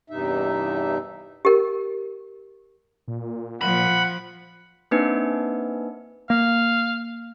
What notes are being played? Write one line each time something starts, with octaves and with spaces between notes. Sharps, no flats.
E2 G2 C3 D#4 E5
G4 A#4
A#2
F3 F#5 B5
A#3 C4 D4 D#4 B4
A#3 F5